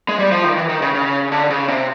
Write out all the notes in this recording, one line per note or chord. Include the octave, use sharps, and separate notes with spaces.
G#3
G3
F3
D#3
E3
D#3
C#3
C#3
D3
C#3
C3